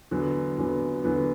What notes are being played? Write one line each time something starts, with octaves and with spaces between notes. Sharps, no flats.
E2 D3 F#3 B3
E2 D3 F#3 B3
E2 D3 F#3 B3